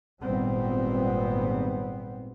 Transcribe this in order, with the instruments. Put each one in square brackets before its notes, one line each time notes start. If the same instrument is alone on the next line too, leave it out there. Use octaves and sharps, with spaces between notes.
[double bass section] G#1 A#2 G3 B3 C4